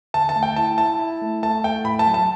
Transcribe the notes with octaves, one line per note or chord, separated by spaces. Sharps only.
D3 A5
A5
A3
G5
E4 A5
E4 A5
E4
A3
A3 A5
A3 G5
A2 B5
A5
F#3
A5